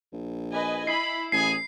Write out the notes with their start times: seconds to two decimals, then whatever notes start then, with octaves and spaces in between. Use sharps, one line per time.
0.12 A#1
0.52 B4 D#5 G#5
0.87 E4 B5 C7
1.32 A1 G#4 G#5 C7